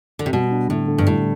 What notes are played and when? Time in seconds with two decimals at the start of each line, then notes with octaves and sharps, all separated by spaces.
0.19 D3
0.26 C3
0.33 B2 G3
0.51 D4
0.70 A2 D3
0.88 D3
0.98 G2
1.07 A2 G3